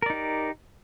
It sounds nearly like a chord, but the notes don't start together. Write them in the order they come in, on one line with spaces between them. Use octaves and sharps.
A#4 D5 D#4 G4